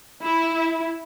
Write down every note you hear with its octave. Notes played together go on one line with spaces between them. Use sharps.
E4